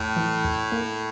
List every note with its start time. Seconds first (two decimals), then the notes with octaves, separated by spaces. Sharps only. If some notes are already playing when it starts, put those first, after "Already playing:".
Already playing: E2 A2
0.17 E3
0.45 E2
0.72 A#3